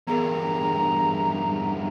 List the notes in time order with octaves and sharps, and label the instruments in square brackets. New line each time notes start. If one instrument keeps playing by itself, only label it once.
[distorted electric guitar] E2 G2 [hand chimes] B3 G#4 A#4 [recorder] A#5